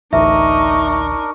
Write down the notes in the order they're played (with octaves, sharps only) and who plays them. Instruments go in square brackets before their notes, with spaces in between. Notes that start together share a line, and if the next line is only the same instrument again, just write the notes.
[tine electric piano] A1 D2 [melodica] D4 A#4 [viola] D#4 C#6 [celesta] E5